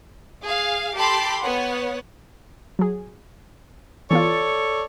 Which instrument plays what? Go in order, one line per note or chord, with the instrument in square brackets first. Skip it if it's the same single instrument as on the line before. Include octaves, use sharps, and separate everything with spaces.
[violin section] G#4 F5
G4 A4 A5 B5 C6 D6
B3 C#5 F#5
[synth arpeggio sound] F#3 G#4
[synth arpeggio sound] E3 B3 F4 [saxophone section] A4 C#5 D5